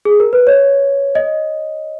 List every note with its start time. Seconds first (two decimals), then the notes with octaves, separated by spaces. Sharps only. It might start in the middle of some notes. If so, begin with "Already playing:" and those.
0.05 G#4
0.20 A#4
0.33 B4
0.47 C#5
1.15 D#5